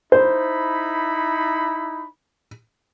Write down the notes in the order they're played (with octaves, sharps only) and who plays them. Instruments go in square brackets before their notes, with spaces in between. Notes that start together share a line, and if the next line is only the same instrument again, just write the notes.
[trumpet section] D#4 E4 B5 [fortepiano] C5